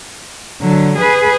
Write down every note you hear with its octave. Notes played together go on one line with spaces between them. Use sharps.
D3 F#3
G#4 B4